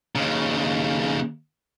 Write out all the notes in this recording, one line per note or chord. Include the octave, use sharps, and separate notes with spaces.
D#2 C#3